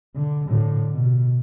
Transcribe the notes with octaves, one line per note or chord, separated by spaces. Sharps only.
D3
A2 D3
B2